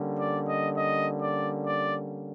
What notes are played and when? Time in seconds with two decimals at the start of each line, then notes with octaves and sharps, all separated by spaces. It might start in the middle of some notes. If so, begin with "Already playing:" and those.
Already playing: D3 G3 A#3 C#4
0.19 D5
0.49 D#5
0.78 D#5
1.21 D5
1.66 D5